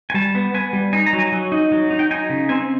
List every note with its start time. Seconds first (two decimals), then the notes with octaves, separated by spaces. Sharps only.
0.10 G#5
0.14 G3 A5
0.35 B3
0.54 B3 G#5
0.73 G3
0.93 D#4 G#5
1.06 A#5
1.13 F#3
1.19 G#5
1.32 F#3
1.52 D#4
1.72 F#3
1.91 D#4
1.99 G5
2.11 D#4 G#5
2.30 C#3
2.49 C4 G#5